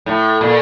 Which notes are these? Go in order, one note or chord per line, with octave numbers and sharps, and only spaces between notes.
A2
A#2